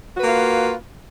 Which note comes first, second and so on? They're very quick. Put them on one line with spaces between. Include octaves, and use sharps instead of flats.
F#4 B4 A#3 F4